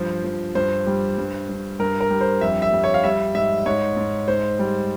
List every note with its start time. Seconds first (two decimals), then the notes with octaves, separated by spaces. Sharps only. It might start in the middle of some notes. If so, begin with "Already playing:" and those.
Already playing: G2 F3 C5
0.24 F3
0.55 G2 C5
0.87 G3
1.18 G2
1.49 G2
1.79 G2 A#4
2.01 A#4
2.10 G3
2.21 C5
2.41 F2 E5
2.62 E5
2.73 G3
2.84 C#5
2.94 F5
3.04 G3 E5
3.34 G#2 E5
3.66 G#2 C#5
3.97 G#2
4.28 G#2 C5
4.59 G3